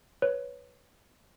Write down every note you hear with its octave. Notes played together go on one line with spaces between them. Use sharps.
B4 C#5